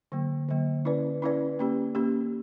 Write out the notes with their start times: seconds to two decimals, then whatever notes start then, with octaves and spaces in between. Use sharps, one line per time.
0.12 D3 F#3 A#3
0.49 D3 F#3 A#3
0.85 C#4 E4 B4 D5
1.22 C#4 E4 B4 D5
1.59 A#3 C#4 G4
1.95 A#3 C#4 G4